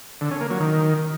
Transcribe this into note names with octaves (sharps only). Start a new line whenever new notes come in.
D3
C#4
A#3
F#3
D#3